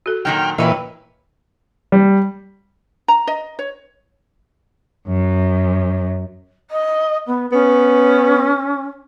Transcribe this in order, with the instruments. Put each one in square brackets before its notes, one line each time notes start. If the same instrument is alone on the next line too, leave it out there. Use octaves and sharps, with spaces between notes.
[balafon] F#4 A4
[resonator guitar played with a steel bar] A#2 D#3 F#3 [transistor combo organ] G5 F6
[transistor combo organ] A#2 E3 [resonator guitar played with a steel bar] B4 C#5 [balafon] D#5 G5
[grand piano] G3
[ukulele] A#5
D#5
C#5
[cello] F#2
[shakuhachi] D#5
B3
[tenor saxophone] B3 [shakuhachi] C#4